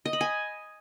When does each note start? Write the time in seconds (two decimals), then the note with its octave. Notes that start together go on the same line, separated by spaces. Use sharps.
0.05 D#5
0.13 B5
0.21 G#5